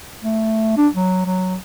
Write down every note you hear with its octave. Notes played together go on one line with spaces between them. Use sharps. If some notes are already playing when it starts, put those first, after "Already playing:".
A3
D4
F#3
F#3